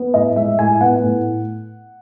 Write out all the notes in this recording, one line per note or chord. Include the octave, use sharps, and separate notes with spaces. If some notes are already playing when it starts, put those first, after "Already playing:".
Already playing: B3
A2 D#5
G#3 E5
A2 G#5
B3 F#5
A2